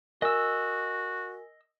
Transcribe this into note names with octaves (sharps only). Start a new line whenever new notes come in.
F#4 A#4 D#5 G#5 E6